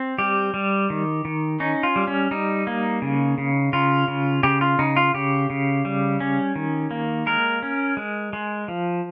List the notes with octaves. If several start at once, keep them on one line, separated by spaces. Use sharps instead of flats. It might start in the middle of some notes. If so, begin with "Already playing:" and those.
Already playing: C4
G3 G4
G3
D#3
D#3
C#4 D#4
F4
G3
C#4
G3 D#4
A#3
C#3
C#3
C#3 F4
C#3
C#3 G4
F4
C#3 D#4
F4
C#3 G4
C#3
G3
C#4
D#3
A#3
G#3 A#4
C#4
G#3
G#3
F3